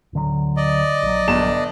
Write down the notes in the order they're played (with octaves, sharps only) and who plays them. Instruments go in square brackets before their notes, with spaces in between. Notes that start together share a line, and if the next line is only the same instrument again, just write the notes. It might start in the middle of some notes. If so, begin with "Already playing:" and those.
[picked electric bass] D1 D3 F#3
[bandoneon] D5 D#5
[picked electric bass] A#1 F#3
[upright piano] G1 A5 E7